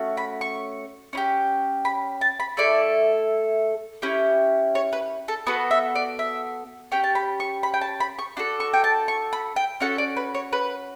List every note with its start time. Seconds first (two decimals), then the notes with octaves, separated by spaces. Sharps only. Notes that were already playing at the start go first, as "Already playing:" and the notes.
Already playing: A3 C#4 F#4
0.17 B5
0.41 C#6
1.13 C#4 E4
1.17 G4
1.85 B5
2.21 A5
2.40 B5
2.57 A3 E4 A4 D5
4.02 C#4 E4 G4
4.75 C#5
4.93 B4
5.28 A4
5.47 B3 F#4 A4 B4
5.71 E5
5.95 D5
6.19 E5
6.92 C#4 G4 G5
7.04 A5
7.15 B5
7.40 C#6
7.63 B5
7.74 G5
7.81 A5
8.00 B5
8.19 C#6
8.37 D4 F#4 A4
8.60 C#6
8.74 G5
8.84 A5
9.08 C#6
9.33 B5
9.56 G5
9.80 C#4 F#4 A4 F#5
9.98 D5
10.17 B4
10.35 C#5
10.53 B4